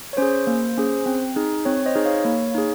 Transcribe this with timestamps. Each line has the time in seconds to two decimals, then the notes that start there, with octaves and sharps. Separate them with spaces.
0.13 C#5
0.17 C#4 G#4 C5
0.47 A#3
0.77 C#4 G#4
1.06 C4
1.36 D#4 G#4
1.65 C4 C#5
1.86 C5 D#5
1.95 D#4 G#4
2.05 C#5 F5
2.25 A#3
2.55 D#4 G#4